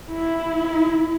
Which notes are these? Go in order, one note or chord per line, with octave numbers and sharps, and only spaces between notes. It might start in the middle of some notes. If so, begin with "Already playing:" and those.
E4